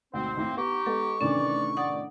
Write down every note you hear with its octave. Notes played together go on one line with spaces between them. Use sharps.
D2 G#2 B2 C4 C5
D#2 A2 A#3 C4 E4
B3 D#4 G4 C#6
G#3 B3 A4
A2 C3 D#3 E3 C#4 D4 D5
D5 F#5 D#6